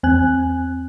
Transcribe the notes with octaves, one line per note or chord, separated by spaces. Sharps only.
E2 C4 G#5 F#6